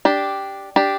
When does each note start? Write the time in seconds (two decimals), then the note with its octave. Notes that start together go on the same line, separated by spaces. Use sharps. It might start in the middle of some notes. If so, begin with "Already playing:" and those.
0.05 D4 G4
0.76 D4 G4